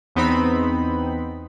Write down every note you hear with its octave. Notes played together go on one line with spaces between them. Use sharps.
E2 B3 C4 D#4 B5